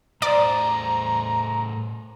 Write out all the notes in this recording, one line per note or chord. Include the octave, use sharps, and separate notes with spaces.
A2 C5 D5 A#5